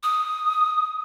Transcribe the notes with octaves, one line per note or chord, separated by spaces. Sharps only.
D#6